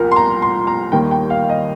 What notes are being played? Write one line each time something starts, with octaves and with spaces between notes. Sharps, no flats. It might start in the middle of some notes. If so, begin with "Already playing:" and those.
Already playing: C2 A#2 F3 A#4
C6
A#5
C6
A#5
D#2 D#3 G3 A#3 G5
G5
F5
F5
D#5